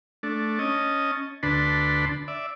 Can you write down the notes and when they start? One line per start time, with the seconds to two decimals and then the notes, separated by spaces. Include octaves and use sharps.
0.23 A3 D4
0.59 C#4 D#5 A5
1.43 D2 D4 B4 A5 B5 C6
2.28 D5 E5